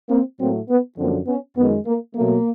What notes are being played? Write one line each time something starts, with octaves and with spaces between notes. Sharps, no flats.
A#3 C4
A2 F#3 A3 A#3 C4
B3
F#2 D3 F3 A#3 C4
B3 C#4
F#2 D#3 G#3 B3
A#3
B2 F#3 A3 A#3